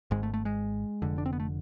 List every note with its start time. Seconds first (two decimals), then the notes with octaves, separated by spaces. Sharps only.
0.11 G#1 G#2 G#3
0.23 A3
0.34 A3
0.45 G#3
1.02 F1 F2 D3
1.18 D4
1.26 C4
1.33 B3
1.40 A3